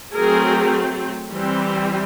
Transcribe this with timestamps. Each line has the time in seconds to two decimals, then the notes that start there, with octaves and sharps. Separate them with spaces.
0.15 F#3 A3 C4 G#4 A#4
1.31 E3 G3 C4